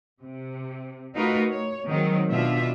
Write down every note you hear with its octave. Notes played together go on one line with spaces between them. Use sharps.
C3
A3 D#4 F4 F#4 A#4 B4
C#5
D#3 F#3 G#3 C4
B2 D4 F4 E5